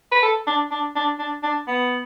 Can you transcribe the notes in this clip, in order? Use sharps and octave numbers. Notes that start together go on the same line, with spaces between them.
B4
A4
D4
D4
D4
D4
D4
B3